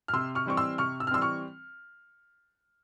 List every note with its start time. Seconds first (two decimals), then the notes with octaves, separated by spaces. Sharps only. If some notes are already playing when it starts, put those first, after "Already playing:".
0.08 F6
0.13 C3 C6 E6
0.35 C#6 F6
0.46 E3 G3 C4 C#6
0.57 C6 E6
0.78 C3 C#6 F6
1.00 E6
1.07 F6
1.11 E3 G3 C4 C6 E6
1.21 C#6 F6